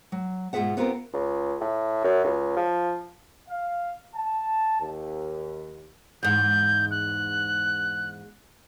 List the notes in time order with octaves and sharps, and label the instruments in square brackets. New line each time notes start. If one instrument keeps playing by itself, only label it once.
[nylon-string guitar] F#3
G#2 B2 F4 G#4 E5 F#5
B3 C4 F4 G4 A#4
[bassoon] C#2
A2
F#2
C#2
F3
[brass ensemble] F5
A5
D#2
[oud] E2 G#2 [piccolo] G6
[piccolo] F#6